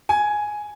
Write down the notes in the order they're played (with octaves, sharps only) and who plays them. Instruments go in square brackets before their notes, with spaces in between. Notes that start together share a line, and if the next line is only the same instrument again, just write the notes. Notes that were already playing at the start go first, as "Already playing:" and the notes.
[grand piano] G#5